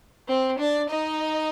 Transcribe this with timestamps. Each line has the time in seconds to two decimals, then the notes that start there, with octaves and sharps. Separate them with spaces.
0.27 C4 C5
0.58 D4 D5
0.89 D#4 D#5